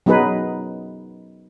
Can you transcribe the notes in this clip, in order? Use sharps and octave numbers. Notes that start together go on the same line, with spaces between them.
F#3 B3 D#4 G#4 B4